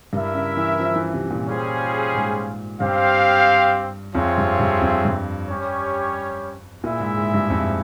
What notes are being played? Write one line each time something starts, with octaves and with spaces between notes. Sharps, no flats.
G2 E4 A#4 E5
C#3
E3
F3
E3
C3
A#2
G3 C#4 F4 G#4 C5
G#2
G2 C4 G4 C5 F5
F2 C4 F4 G#4 C#5 E5
G2
G2
F2
G2
G3 C#4 G4 C#5
A#2 E4 G#4 E5
G#2
G#2
G2
F2